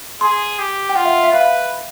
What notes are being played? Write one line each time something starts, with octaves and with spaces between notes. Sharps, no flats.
G#4 C6
G4
G5
F4 F#5
E5
E5
B4 F5